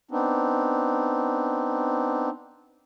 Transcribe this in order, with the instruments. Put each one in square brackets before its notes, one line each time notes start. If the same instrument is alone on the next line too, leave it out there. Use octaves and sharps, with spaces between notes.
[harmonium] B3 C4 D4 D#4